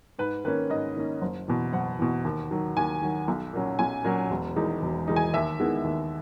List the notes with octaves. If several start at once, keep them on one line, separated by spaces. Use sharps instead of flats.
G#2 B4
D#3 A#3 C#4 B4
G#2 D#5
D#3 A#3 C#4
F#1
E2 B2
F#1 F#5
E2 B2
D#2
D#3 F#3
D#2 G#5
D#3 F#3
B1
A#2 F#3 C#4
B1 G#5
A#2 F#3 C#4
E1
E2 D#3 G#3 D#4
E1
E2 D#3 G#3 D#4
G#5
D#2 E5
D#3 G#3 B3 E4
D#2